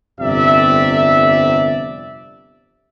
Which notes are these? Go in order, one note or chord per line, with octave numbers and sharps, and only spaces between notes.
G1 F2 C3 D5 E5